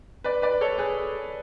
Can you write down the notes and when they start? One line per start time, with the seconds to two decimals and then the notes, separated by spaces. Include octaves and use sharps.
0.24 B4 D5
0.42 B4 D5
0.61 A4 C#5
0.78 G#4 B4